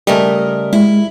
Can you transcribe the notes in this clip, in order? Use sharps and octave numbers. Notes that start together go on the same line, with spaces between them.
C#3 G3 A3 A#4 D#5
G#3 E4